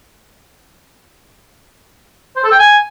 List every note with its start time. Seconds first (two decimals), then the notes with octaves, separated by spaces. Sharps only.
2.36 C5
2.44 A4
2.51 G5
2.59 G#5